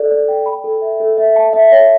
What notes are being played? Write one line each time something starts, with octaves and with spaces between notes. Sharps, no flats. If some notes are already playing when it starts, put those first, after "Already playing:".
Already playing: A4 D5
D5
G5
B5
A4
E5
A4
E5
A5
E5
C#5